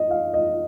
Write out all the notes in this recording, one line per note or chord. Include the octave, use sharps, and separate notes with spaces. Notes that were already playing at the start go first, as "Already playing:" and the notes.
Already playing: D#5
F5
D#5